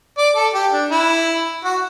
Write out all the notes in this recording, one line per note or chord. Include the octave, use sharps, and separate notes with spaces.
D5
A4
G4
D4
E4
F#4